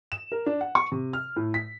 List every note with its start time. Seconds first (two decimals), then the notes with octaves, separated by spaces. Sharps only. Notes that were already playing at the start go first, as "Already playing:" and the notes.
0.12 E7
0.32 A#4
0.46 D4
0.61 F#5
0.75 C#6
0.92 C3
1.13 F6
1.36 A2
1.54 B6